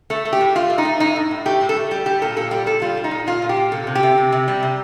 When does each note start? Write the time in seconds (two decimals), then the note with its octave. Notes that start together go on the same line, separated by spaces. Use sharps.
0.10 A3 A4
0.25 A3
0.33 G4
0.41 A2
0.55 A3 F4
0.70 A3
0.78 D#4
0.85 A3
1.00 A2 D#4
1.16 A2
1.31 A2
1.46 A3 G4
1.61 A2
1.69 A4
1.76 A3
1.91 G3 G4
2.06 G3 G4
2.22 A#2 A4
2.37 A#2 A4
2.51 G3 G4
2.66 A#2 A4
2.82 G3 F4
2.97 G3
3.04 D#4
3.11 A#2
3.27 A#2 F4
3.42 A#2
3.49 G4
3.57 A#2
3.71 C3 A4
3.87 C3
3.95 G4
4.03 C3
4.18 C3
4.32 C3
4.48 G3
4.63 C3